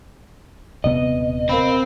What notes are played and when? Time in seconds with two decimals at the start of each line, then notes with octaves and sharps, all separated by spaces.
0.84 D#1 C3 B3 D#5
1.49 C4 A#4 F5 B5